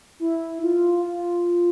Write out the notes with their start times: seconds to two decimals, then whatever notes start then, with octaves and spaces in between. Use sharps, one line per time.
0.20 E4
0.63 F4
1.06 F4